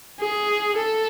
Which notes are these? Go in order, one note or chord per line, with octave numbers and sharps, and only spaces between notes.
G#4
A4